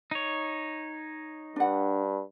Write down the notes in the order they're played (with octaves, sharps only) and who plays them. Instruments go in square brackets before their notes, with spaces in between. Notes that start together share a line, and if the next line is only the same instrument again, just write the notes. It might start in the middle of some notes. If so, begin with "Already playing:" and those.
[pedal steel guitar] D#4 C#5
[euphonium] G2 [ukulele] D4 F#5